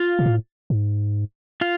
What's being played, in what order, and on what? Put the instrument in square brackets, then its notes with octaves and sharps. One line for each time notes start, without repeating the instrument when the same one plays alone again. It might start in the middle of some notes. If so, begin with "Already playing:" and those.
Already playing: [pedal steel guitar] F4 F5
[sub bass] B2
A2
G#2
[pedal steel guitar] F4 F5